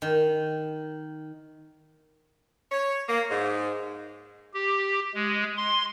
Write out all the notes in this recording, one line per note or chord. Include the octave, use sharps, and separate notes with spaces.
D#3
C#5
A#3
G#2
G4
G#3
C6